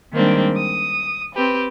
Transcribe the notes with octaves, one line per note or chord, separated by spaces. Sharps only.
D#3 G3 G#3 A#3 C4 D4
D#6
C4 G4 B4